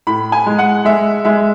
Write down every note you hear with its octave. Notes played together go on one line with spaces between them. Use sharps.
A2 B5
G#5
G#3
F#5
G#3 E5
G#3 E5